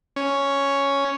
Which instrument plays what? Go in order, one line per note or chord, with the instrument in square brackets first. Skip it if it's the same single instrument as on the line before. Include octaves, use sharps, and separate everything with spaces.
[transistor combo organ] C#4